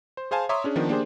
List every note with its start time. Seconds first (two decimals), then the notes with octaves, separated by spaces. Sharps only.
0.17 C5
0.31 G#4 C5 F5 G#5 A5
0.49 C#5 E5 A#5 C6 D6 D#6
0.64 C#4 D4 G#4
0.76 D#3 F3 B3 D4
0.89 A#3 D4 G4 G#4 C5